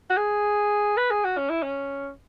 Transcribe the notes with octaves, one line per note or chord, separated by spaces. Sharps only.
F#4
G#4
B4
G#4
F#4
C#4
E4
C#4